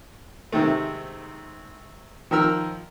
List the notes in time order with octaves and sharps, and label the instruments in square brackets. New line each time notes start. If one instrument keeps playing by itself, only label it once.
[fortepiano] G#2 C3 D#3 A3
D#3 F3 A#4 E6